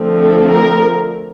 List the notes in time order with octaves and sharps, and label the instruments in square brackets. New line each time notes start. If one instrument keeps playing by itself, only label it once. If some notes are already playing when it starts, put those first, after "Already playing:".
Already playing: [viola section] D3 F3 A3 C4
A4
A#4